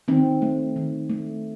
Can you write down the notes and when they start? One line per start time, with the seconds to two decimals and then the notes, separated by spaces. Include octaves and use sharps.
0.08 D#3 C4
0.42 A3
0.76 D#3
1.10 A3